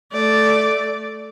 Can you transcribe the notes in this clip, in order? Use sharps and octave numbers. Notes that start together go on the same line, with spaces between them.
A3 D5